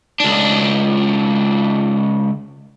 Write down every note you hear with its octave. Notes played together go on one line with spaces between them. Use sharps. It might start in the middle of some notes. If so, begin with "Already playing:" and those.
C#2 D4